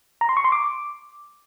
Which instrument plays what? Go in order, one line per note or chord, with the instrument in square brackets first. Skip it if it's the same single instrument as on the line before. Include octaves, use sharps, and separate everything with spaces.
[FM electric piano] A#5
C6
C#6
C6
D6